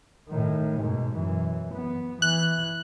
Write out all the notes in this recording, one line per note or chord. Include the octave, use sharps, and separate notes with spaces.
A2 D#3
G#2 B2
F#2 E3
B3
E3 F#6